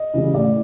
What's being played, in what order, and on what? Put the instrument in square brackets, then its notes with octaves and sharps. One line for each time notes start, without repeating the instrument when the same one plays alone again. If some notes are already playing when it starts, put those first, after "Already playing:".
Already playing: [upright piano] D#5
C#3 E3 G3
A2 D5